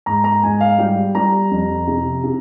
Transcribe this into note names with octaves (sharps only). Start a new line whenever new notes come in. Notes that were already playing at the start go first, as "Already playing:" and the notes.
G#2 A#5
A#5
G#2 G#5
F5
G3 G5
G3 A#5
F2
C3
C3